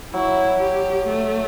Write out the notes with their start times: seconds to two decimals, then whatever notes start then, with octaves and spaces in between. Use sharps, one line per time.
0.14 F#3 E4
0.60 G4
1.07 A3